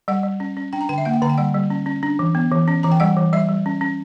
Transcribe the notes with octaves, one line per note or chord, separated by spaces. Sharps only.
G3 F#5
G3
C#4
C#4
D4 G5
A#5
D3 G5
E5
A#3 F#5
G5
D3 A#5
G5
G3 F#5
G3
C#4
C#4
D4
E3
B3
E3
C#4
E3 A#5
G5
G3 F#5
E3
G3 E5
G3
C#4
C#4